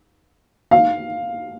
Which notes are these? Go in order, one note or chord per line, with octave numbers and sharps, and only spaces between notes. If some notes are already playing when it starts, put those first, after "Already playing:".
F5